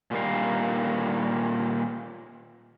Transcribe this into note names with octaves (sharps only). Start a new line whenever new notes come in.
A#2 D3 D#3 G3 A#4 F5